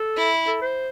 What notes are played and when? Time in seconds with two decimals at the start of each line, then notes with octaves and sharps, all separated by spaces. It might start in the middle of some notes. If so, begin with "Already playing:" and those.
Already playing: A4
0.17 E4
0.47 A4
0.61 C5